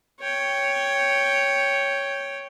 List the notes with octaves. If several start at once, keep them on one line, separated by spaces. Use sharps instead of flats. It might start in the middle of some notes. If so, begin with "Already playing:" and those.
C#5 G5